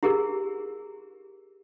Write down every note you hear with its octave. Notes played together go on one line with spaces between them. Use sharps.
E4 G4 G#4 A#4